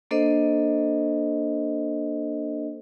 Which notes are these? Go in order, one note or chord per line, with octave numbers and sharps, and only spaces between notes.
A#3 D4 A4 C5 D#5